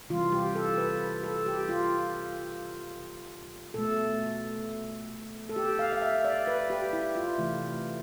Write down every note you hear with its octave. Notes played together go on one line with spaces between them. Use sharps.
C3 E3 G3 F4
G4
A4
B4
A4
G4
F4
B2 A3 A4
A4
G4
F5
F5
E5
D5
B4
G4
E4
F4
C3 E3 A3